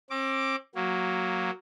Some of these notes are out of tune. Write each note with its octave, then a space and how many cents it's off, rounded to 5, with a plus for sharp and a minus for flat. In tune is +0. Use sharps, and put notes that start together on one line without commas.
C4 +40 D6 +0
F#3 +0 A#3 +0